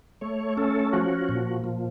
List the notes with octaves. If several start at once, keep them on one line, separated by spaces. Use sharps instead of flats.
A3 C#5
C#4 A4
F3 F#4
A#2
F3